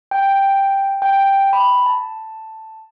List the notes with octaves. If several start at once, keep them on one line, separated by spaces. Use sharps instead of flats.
G5
G5
B5
A5